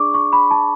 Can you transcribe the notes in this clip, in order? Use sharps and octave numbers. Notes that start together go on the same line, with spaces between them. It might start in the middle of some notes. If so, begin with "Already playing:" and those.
Already playing: D4 G#4 D5 C#6 D6
C#6
B5
A5